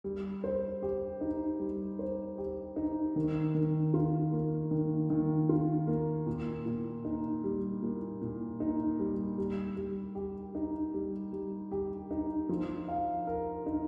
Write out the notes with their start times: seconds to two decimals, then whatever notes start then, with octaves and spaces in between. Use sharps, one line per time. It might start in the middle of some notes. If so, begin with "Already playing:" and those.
0.04 G3
0.44 C5
0.82 G4
1.21 D#4
1.60 G3
1.99 C5
2.38 G4
2.76 D#4
3.16 D#3
3.55 D#3
3.94 F4
4.32 A#3
4.71 D#3
5.10 D#3
5.49 F4
5.87 A#3
6.27 A#2
6.66 A#2
7.05 D#4
7.44 G3
7.82 A#2
8.22 A#2
8.60 D#4
8.99 G3
9.38 G3
9.76 G3
10.15 G4
10.55 D#4
10.94 G3
11.33 G3
11.71 G4
12.11 D#4
12.49 F3
12.88 F5
13.27 A#4
13.66 D#4